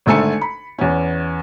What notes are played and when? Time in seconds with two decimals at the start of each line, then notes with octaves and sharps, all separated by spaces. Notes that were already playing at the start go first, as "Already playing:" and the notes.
0.06 G#1 D3 A3 A4 G#5 C#7
0.41 B5
0.78 E2 B3 C#4